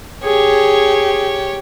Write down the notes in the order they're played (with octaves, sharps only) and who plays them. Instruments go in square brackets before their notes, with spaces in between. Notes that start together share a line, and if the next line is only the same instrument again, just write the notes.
[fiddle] G4 C#5 [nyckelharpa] G#4